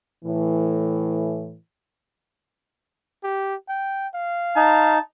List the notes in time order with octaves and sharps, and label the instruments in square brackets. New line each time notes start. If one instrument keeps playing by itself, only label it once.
[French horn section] A2 E3
[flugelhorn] G4
G5
F5
[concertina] D#4 [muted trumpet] A5